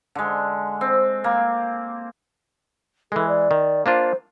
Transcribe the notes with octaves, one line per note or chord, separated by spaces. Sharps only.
D3 G#3
C4
A#3
E3 G#3 A4
D5
D#3
A#3 D4 F4 C5